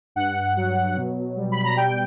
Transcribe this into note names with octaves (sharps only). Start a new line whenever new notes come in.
G2 F#5
F#3
B2
G3
B5
A#5
G3 G5